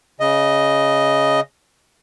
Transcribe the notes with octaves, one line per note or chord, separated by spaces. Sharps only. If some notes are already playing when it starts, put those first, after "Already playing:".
C#3 D#5